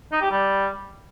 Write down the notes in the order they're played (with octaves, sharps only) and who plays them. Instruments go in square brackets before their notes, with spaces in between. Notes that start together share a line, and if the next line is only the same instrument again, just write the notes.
[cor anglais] D#4
G4
G3